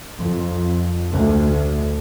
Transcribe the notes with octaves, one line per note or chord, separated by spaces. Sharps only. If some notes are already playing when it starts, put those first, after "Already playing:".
F2
D2